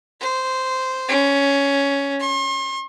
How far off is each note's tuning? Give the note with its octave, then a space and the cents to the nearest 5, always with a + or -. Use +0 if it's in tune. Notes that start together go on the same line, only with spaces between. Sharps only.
C5 -10
C#4 +10
C6 +45